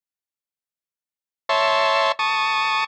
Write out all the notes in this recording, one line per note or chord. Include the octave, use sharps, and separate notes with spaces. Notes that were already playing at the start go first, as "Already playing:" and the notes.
C#5 E5 A5 C6
A5 C#6 D#6